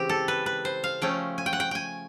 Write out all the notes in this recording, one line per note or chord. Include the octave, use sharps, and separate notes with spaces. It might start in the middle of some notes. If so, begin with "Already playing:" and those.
Already playing: C#3 E3 G#3 C4 G4
A4
B4
B4
C5
F5
F3 A3 C#4 G5
G#5
G5
F#5
G5
G5 G#5